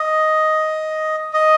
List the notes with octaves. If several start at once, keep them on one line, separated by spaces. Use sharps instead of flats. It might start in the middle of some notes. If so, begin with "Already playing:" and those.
Already playing: D#5
D#5